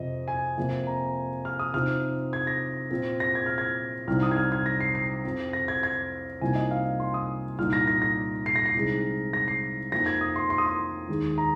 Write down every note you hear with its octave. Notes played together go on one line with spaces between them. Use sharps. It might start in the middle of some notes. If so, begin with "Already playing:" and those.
Already playing: F2 C3 F3 D#5
G#5
F2 C3 F3 A#3
A#5
F6
D#6
C3 F3 C4 D#4 F6
G#6
A#6
A#2 F3 C4
A#6
G#6
F6
G#6
C2 C3 F3 C4 D#4 F6
D#6
G#6
F6
G#6
A#6
C7
C7
F2 F3 C4
A#6
G#6
G#6
C2 C3 F3 A#3 D#4 G#5
D#5
F5
C6
D#6
C2 A#2 A#3 D#4 F6
A#6
A#6
A#6
C7
A#6
C7
C2 C3 G#3 D#4
A#6
C7
F2 F3 A#3 D#4 A#6
G#6
D#6
C6
C6
D#6
C6
D#2 D#3 G#3
A#5